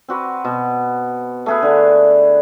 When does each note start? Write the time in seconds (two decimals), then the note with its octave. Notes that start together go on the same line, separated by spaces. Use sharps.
0.08 C4 F#4 B4
0.45 B2
1.46 A3 G#4 B4
1.62 D3